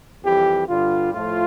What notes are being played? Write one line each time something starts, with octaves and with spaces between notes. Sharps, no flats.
F2 E3 G3 G4
G2 D3 G3 F4
A2 F3 A3 F4